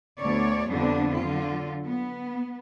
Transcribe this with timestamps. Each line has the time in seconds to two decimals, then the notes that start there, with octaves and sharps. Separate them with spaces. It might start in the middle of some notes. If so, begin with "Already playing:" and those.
0.21 D2 B3 C#5 D5
0.70 F2 D3 G3 B3 D4
1.19 D3 F#3 F4
1.87 B3